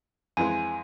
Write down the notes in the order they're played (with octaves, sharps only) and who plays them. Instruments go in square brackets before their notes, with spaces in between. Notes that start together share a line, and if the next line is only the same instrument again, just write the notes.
[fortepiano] F2 E3 G#3 [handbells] G#5